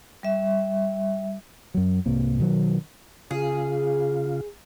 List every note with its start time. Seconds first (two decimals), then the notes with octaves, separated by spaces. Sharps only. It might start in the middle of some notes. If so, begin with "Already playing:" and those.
0.23 G3 E5
1.74 F#2 F#3
2.06 C2 G#2 C3 A#3
2.39 B2 D#3 E3 F#3
3.31 C#3 F4 G#4